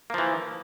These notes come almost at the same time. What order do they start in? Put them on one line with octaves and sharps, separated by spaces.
A#3 F3 E3